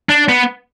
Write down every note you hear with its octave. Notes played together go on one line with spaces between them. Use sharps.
D4
B3